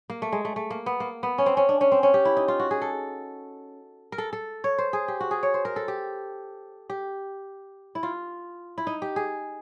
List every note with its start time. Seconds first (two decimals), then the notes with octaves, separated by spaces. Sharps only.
0.10 A#3
0.22 A3
0.32 G#3
0.45 A3
0.56 A3
0.71 A#3
0.86 B3
1.00 A#3
1.23 B3
1.38 C#4
1.46 C4
1.57 C#4
1.69 D4
1.81 C#4
1.92 C4
2.03 C#4
2.14 G4
2.25 E4
2.37 D#4
2.48 F4
2.59 F#4
2.71 G#4
2.82 A4
4.12 A#4
4.18 A4
4.33 A4
4.64 C#5
4.78 C5
4.93 G#4
5.08 G4
5.20 F#4
5.31 G#4
5.43 C#5
5.54 C5
5.65 A#4
5.76 A4
5.88 G4
6.90 G4
7.95 E4
8.03 F4
8.78 E4
8.87 D#4
9.02 G4
9.16 G#4